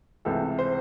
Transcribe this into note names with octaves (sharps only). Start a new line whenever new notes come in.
C#2 C3 E3 A3 A4
C5